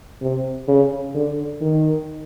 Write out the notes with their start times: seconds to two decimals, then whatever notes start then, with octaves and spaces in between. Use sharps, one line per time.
0.22 C3
0.68 C#3
1.15 D3
1.61 D#3